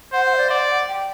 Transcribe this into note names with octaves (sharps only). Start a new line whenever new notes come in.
C5 F#5
F#5
E5
D5
D5 F#5
F#5
G5